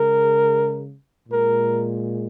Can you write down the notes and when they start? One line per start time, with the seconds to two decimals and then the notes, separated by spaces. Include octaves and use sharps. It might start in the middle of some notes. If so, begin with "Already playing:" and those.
Already playing: C#3 G#3 A#4
1.28 A#2 G#3 A#4